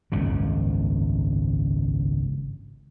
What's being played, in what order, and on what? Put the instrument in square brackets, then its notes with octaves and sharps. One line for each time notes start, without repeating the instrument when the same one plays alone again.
[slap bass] G#1 C#2 F#2 C#3